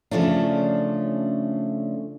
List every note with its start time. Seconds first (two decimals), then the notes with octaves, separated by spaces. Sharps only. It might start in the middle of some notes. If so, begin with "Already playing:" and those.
0.11 C#3 F3 A3 C#4 D4